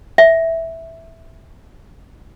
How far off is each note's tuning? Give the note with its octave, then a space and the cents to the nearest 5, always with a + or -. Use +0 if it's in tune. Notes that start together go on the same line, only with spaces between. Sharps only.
E5 -5